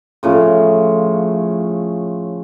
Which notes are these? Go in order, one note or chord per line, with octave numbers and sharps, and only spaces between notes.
A2 C#3 F3